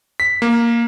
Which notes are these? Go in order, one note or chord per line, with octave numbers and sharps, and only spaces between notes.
B6
A#3